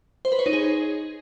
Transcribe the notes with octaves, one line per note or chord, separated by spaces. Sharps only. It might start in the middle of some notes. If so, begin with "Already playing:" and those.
C5
B4
C#5
D#4
G#4